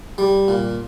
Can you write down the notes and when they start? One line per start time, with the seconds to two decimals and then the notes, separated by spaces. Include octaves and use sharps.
0.18 G3
0.48 A#2